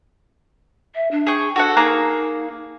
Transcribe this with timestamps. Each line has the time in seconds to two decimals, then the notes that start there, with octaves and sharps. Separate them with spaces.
0.95 E5
1.11 D4
1.27 G#4 G5 C#6
1.56 F#4 A4 F#5
1.76 A#3 D#4 G#4 A#5